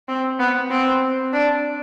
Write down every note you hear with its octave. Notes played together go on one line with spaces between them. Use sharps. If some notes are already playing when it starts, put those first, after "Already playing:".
C4
B3
C4
D4